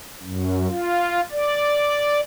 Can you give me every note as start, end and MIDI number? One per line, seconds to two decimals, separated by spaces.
0.22 0.67 42
0.69 1.20 65
1.31 2.20 74